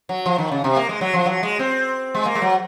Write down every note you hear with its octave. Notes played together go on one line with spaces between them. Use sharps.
F#3
F3
D#3
C#3
C3
A#3
G#3
F#3
F3
F#3
G#3
C4
G#3
A#3
G#3
F#3